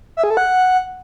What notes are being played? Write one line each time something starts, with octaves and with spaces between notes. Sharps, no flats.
E5
G#4
A4
F#5